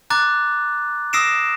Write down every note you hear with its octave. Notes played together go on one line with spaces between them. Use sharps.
A#5 D6 F#6 A6
D#6 E6 A#6 C7 D7 E7